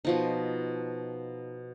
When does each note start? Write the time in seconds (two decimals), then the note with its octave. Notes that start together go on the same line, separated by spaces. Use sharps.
0.05 B2 F3 D#4